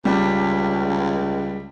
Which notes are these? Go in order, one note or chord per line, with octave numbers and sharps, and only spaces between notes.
C#2 G3